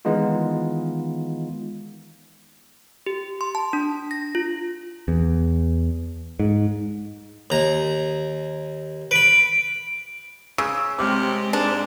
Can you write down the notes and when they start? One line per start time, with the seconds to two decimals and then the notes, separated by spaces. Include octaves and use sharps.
0.05 D#3 E3 G#3 B3 D#4 F4
3.06 G4
3.41 C6
3.55 A5
3.73 D4
4.11 A#6
4.35 F4
5.08 E2
6.40 G#2
7.50 D#2 A#5
9.11 B4 B5 D7
10.58 C#3 C#6 E6
10.98 C3 G#3 C4 G4 D6 F6
11.53 G#2 D4